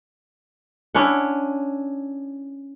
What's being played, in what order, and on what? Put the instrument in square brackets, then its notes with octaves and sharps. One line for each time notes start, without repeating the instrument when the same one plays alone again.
[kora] C#4 D4 E4 F#5